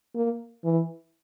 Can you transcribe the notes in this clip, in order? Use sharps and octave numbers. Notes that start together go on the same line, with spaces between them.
A#3
E3